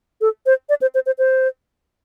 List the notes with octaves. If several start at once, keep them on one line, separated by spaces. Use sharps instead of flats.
A4
C5
D5
C5
C5
C5
C5